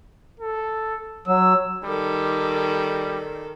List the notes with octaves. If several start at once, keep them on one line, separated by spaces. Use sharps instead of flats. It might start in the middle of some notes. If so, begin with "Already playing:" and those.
A4
F#3 E6
D#3 G3 A4